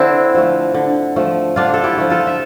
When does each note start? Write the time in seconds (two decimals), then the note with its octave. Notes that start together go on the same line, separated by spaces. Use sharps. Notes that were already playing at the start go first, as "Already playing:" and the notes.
Already playing: D3 C4 D4 E4
0.35 F3 A3
0.74 D3
1.16 F3 A3
1.56 D3 D4 F4
1.74 A4
1.84 E4 G4
1.98 F3 A3
2.10 F4 A4
2.27 E5